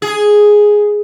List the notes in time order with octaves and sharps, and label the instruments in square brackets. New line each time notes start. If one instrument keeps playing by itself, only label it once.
[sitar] G#4